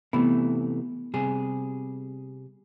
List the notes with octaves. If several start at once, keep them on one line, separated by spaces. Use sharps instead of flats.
C3 E3 A3 B3
C3 G3 G#4